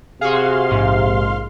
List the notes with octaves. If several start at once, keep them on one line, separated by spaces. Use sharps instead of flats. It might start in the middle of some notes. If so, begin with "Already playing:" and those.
C3 F#4 G#4 F5 C6
A#1 G#2